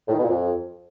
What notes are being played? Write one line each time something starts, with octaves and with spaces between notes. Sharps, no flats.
A2
D#3
B2
A#2
F2